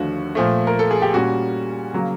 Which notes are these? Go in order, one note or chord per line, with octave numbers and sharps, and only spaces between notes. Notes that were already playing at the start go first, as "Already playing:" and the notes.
Already playing: D#2 D3 F3 A3 D4 F#4
A#2 F3 A3
A#4
A4
G#4
G4
A#2 G3 A#3 C#4 F#4
C#3 F#3 A#3